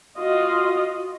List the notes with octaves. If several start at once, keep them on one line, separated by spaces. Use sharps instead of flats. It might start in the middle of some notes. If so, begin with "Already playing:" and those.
F4 F#4 D#5